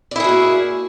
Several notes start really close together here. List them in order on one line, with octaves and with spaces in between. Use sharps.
D5 E4 G#4 F#4 A#3